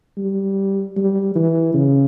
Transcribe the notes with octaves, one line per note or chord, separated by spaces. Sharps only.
G3
G3
E3
C#3